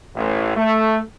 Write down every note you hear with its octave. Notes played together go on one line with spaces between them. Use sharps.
A1
A3